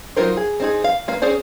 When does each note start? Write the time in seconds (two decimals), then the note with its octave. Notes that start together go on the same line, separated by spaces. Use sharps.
0.16 F#3 D#4 F4 A#4 C5
0.37 G#4
0.60 C4 D#4 G#4
0.84 F5
1.08 A#3 B4 F5
1.22 C4 C#4 G#4 C5 D5